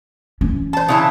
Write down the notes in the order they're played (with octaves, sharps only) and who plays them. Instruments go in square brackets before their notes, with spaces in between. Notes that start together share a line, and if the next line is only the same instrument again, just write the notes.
[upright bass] E3 C#4
[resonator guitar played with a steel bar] C5 A5
C#3 E3 A5